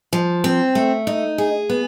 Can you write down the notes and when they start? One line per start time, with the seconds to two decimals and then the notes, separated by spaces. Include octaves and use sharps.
0.13 F3
0.44 C4
0.75 A3
1.07 D#4
1.38 G#4
1.70 B3